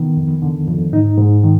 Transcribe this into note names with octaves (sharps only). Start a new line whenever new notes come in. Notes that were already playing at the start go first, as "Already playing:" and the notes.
Already playing: D#3 B3
F2
D3
F2
G#2 D#4
G#2
D#3